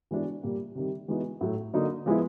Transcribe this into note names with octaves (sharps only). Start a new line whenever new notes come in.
E3 G#3 B3 D4 F#4
A#2 G3 A#3
C3 D#3 G3
E3 G#3 B3 D#4 F#4
A2 F#3 A3
D3 F#3 A#3 D#4 F#4
F3 G#3 B3 E4